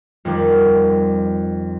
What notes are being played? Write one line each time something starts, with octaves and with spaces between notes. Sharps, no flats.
F2 D#3 G3